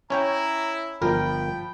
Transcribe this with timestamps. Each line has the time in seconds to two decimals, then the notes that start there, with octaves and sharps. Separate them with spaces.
0.10 C#4 E4 C#5 G5 A#5
1.02 G1 F3 A#4 G5 B5